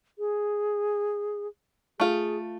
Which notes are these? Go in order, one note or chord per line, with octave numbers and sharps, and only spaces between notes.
G#4
A3 F4 G#4